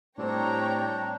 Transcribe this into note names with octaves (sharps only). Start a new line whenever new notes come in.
A2 G3 C4 D4 C#5 G5 A#5